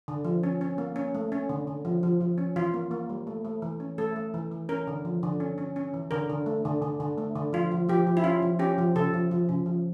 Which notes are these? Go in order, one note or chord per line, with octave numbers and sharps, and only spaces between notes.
D3
F3
C#4
C#4
A#3
C#4
A3
C#4
D3
D3
F3
F3
F3
C#4
E3 F4
A#3
A#3
G3
A3
A3
E3
C#4
A3 A4
A3
E3
E3
C#4 A#4
D3
F3
D3
C#4
C#4
C#4
E3
D3 A#4
D3
A3
D3
D3
D3
A3
D3
F3 F4
F3
F3 G4
F3
E4
C#4 F4
F3
C#4 G4
F3
C#3 A4
F3
F3
C#3
F3